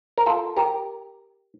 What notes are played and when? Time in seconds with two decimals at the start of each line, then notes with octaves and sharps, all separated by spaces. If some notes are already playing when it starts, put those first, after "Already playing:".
0.18 A#4
0.26 F4 A4
0.57 G4 A#4